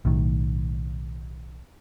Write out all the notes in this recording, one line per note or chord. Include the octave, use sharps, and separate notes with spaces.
B1 A2 D#3